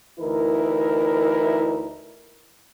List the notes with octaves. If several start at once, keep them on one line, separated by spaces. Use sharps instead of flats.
D2 E3 D#4 E4 A#4